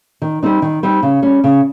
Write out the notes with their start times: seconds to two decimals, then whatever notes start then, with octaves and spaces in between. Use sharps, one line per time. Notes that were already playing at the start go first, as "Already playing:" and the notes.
0.22 D#3
0.43 G3 C4 D#4
0.62 D#3
0.83 G3 C4 D#4
1.03 C#3
1.22 G3 C#4
1.44 C#3